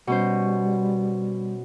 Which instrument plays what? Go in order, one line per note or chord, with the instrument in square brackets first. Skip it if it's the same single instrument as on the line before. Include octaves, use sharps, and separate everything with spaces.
[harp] B2 C#4 C5 [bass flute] G3